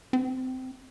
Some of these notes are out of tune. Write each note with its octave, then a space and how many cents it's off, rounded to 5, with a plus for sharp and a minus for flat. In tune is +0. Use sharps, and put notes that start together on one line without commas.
C4 -20